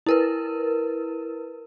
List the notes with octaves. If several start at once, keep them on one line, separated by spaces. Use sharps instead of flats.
E4 A#4 B4